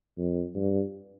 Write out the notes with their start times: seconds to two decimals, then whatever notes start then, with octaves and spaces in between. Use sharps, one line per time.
0.18 F2
0.55 G2